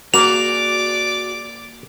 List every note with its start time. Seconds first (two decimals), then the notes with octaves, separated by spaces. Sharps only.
0.14 A#3 F#4 G#4 D5 D6 F7